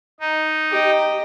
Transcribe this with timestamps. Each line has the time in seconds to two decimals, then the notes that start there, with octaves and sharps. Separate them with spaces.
0.20 D#4
0.71 G4 D#5